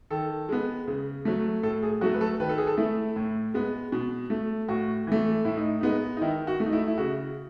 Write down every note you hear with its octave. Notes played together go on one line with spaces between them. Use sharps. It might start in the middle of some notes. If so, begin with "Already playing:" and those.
D#3 A4
G#3 B3
C#3
F#3 A3
A2 A4
G#4
F#3 A3 F#4
B4
A4
D#3 B4
A4
G#4
A4
A3 E4
A2
G#3 B3
B2
A3
A2 F#4
E3 A3
A2 E4
D#4
G#3 B3 D#4
D#4
D#3 E4
F#4
A3
D#4
E4
E4
C#3 F#4